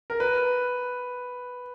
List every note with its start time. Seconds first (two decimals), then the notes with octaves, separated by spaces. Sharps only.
0.10 A#4
0.20 B4